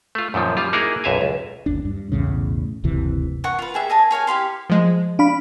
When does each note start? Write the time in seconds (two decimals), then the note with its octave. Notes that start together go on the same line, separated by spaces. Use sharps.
0.15 A3 F4
0.34 F#2 A#2 D#3 F3
0.57 G3 F4
0.73 A#3 D#4 E4 F#4 G#4 A#4
1.04 B1 F#2 E5 F5 G#5
1.21 C#2
1.66 G1 D#2 D4
1.85 G2
2.12 B1 E2 A2 C#3
2.84 F#1 D2 C3 E3
3.44 F#5 C#6
3.59 F4 B4
3.74 G4 G#4 E5
3.90 D#5 G#5 A5
4.11 G#4 C#5 F5 G#5
4.27 E4 G4 F5 C6
4.70 F3 G#3
5.19 D4 F5 B5